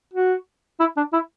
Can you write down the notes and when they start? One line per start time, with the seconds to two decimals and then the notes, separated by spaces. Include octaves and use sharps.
0.13 F#4
0.80 E4
0.97 D4
1.13 E4